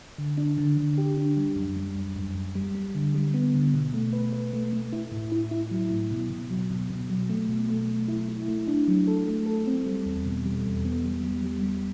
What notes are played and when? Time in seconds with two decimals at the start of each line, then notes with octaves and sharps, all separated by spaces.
0.18 D3
0.38 D4
0.58 D3
0.77 D3
0.98 G4
1.17 D4
1.37 G3
1.56 F#2
1.76 G3
1.96 F#2
2.16 F#2
2.35 F#2
2.55 G3
2.75 G3
2.95 D3
3.14 G3
3.34 B3
3.54 D3
3.74 B2
3.94 A3
4.13 B4
4.33 B4
4.53 A3
4.73 A3
4.92 E4
5.12 A2
5.32 E4
5.51 E4
5.71 F#3
5.91 A2
6.11 B2
6.30 B2
6.50 F#3
6.70 B2
6.90 B2
7.10 F#3
7.30 A3
7.49 B2
7.69 A3
7.88 A3
8.08 E4
8.29 E4
8.48 A3
8.67 D4
8.88 F#3
9.07 A4
9.27 A3
9.46 A4
9.67 C4
9.86 G3
10.06 E2
10.26 B2
10.46 G3
10.65 E2
10.85 B3
11.04 G3
11.24 G3
11.44 G3
11.63 G3